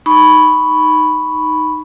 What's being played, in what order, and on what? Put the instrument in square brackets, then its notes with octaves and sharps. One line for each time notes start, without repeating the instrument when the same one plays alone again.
[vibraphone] D#4 B5 C#6